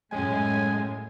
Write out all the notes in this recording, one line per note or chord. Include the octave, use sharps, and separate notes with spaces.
F#2 A2 G#3 A3 C#4 G#5